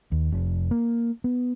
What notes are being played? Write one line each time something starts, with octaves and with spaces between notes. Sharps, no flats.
D#2
F1
A#3
B3